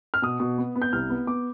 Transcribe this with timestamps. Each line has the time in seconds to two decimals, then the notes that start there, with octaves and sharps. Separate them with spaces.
0.14 F6
0.22 B2 D#6
0.40 B2
0.58 B3
0.75 B3
0.82 G6
0.93 C2 F6
1.10 B3
1.27 B3 D6